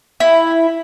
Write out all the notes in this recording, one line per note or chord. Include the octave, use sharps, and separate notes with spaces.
E4